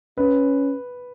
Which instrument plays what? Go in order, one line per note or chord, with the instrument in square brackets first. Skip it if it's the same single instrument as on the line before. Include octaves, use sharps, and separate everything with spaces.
[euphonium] C#4 [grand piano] B4